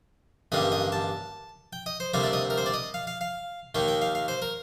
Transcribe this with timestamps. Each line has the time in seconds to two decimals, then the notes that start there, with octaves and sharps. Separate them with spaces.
0.52 A1 G2 D3 G3 A#3 D#5
0.72 D#5
0.92 A5
1.73 G5
1.86 D#5
2.00 C5
2.14 D2 C3 G3 A#3 C5
2.23 D5
2.33 D#5
2.50 A#4
2.58 C5
2.66 D5
2.74 D#5
2.94 F5
3.07 F5
3.21 F5
3.75 D#2 D#3 A#3 G5
3.88 G5
4.02 F5
4.15 F5
4.28 C5
4.42 A#4